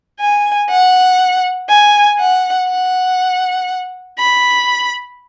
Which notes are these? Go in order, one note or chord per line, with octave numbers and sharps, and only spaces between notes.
G#5
F#5
G#5
F#5
F#5
B5